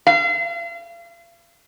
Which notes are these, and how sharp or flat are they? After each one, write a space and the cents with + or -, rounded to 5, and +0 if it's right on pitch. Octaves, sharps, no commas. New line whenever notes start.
F5 -40